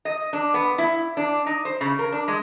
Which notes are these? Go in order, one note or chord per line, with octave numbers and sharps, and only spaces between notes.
D#5
D4
B3
E4
D4
D#4
C5
C#3
A#4
D4
G#3